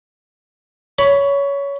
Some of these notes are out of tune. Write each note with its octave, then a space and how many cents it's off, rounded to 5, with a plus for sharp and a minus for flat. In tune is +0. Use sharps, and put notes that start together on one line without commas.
C#5 +20 B5 +0